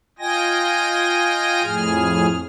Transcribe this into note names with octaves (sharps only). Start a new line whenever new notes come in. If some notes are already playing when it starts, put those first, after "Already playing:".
F4 D#5 G5 G#5 A#6
F2 A2 G#4 F6